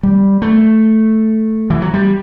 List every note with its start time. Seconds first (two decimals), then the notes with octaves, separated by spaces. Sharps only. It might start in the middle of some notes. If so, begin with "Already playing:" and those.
0.03 G3
0.42 A3
1.70 E3
1.82 F#3
1.94 G3